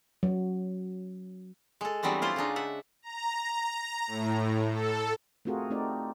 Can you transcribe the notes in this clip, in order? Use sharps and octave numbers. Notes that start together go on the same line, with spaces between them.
F#3
G#3 A4
E3 F#3 G3 B3 C4 D4
E4 F4 C5 D5
C#3 G#3 D4 D#4
E5 F#5
A#5
A2
A4
A3 C4 F4 F#4 G#4 A#4
A3 C4 D#4 D5